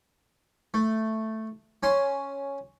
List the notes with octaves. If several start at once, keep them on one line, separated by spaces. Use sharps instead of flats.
A3
C#4 G#5 C6